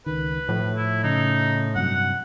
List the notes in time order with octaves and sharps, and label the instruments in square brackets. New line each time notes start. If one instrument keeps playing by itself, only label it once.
[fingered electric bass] C#2 D#3 [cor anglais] B4
[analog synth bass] A2 [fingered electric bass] F3
[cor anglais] E4
[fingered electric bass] C#3 [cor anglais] D#4
[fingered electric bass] G2 C3 F#3 [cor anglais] F#5